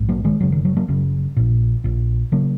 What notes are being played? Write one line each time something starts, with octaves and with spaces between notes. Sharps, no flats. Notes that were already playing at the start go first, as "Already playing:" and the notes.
Already playing: A#1 G#2
F#3 A#3
D#3 G#3
F#1 F#2 C#3 F#3
D#3
F#3
F#3 A#3
F#1 F#2 C#3
A#1 A#2
A#1 A#2
C#3 F#3 A#3